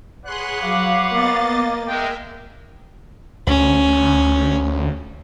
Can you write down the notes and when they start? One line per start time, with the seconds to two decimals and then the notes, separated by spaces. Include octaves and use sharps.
0.24 G#4 B4 C#5 F#5 C6 F#6
0.61 F#3 F5 D6
1.12 A#3 B3 D#5 A6
1.86 G#3 A#4 E5 G5
3.47 D2 C#4